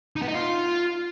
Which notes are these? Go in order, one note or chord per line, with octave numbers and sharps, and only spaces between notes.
D#4
B3
D#4
F4